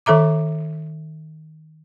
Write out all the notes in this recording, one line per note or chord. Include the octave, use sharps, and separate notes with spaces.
D#3 A4 E5 A#5 D6